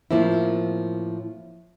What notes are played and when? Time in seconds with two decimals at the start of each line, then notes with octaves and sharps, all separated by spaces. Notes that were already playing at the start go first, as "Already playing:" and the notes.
0.11 A2 F3 A#3 C4 E4